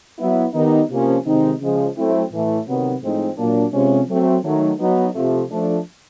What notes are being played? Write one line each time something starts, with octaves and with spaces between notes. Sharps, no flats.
F#3 B3 E4
D#3 G3 B3 D#4
C3 F3 A#3 C#4
C3 D#3 G#3 C4 D#4
C#3 F3 G#3
F#3 A3 C4 E4
A2 E3 A3
C3 D#3 F#3 B3
A2 F3 G#3 C4 D#4
A#2 F#3 A#3 D4
C3 F3 G#3 C#4
F#3 A3 C4
D#3 F#3 A3
F#3 B3 D#4
C3 F3 A3
F3 A3 D4